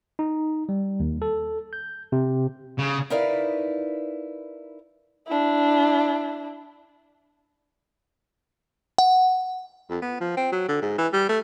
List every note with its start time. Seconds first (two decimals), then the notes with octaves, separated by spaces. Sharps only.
0.19 D#4
0.69 G3
1.00 D#2
1.22 A4
1.73 G6
2.12 C3
2.78 C#3
3.10 D#4 E4 A#4 B4 D5 F5
5.27 D4 E4
8.98 F#5
9.90 F2
10.02 B3
10.21 F3
10.37 C4
10.52 F#3
10.68 D3
10.82 G#2
10.98 E3
11.13 G3
11.29 A3